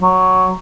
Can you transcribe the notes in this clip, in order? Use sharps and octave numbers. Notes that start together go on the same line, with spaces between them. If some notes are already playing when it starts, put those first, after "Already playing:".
F#3